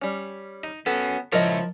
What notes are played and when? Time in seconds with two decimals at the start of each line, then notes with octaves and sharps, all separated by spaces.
0.01 G3 C#4
0.64 D#4
0.86 B3 C#4 F#4 A4
1.32 C#2 F3 E4 A#4 C#5 D#5